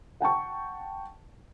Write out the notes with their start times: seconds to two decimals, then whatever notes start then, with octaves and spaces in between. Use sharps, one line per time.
0.20 F#5 G5 A5 C#6